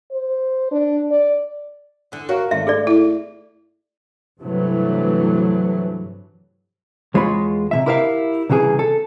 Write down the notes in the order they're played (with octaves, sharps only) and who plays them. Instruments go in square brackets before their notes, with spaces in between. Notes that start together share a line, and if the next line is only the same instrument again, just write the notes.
[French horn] C5
D4
D5
[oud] E2 D3
[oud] F#4 [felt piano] A#4 C#5 F5
[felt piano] G#1 [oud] A3 [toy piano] E5
[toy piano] G#4 A4 D5
[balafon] E4
[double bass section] G2 C3 E3 F#3 A3
[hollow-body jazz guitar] E2 G#3 F4 C#5 B5
C3 E3 E5
E4 G4 A#4 C5 E5 F5
C2 C#3 E3 F#4 G#4
A4